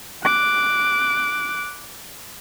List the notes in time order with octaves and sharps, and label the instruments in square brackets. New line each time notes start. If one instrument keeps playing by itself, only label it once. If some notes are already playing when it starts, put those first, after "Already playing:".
[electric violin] D6 F#6